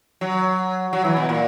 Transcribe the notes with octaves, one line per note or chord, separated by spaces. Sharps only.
F#3
F#3
E3
B2
A#2